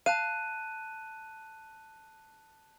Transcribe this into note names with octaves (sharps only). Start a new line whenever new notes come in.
F5 A5 F#6 D#7